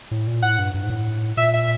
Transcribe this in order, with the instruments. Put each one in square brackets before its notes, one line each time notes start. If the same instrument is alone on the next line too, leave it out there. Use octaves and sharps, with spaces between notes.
[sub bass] A2
A#2
[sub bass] A2 [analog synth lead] F#5
[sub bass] G2
G2
G#2
A2
[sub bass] A#2 [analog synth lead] E5
[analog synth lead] E5